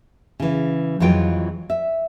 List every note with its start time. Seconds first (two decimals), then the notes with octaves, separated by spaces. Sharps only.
0.40 C#3 E3
1.00 F2 E3 F#3 G#3 F4 G5
1.70 E5